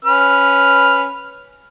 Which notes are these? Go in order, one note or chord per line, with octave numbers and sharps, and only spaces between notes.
C#4 B4 F6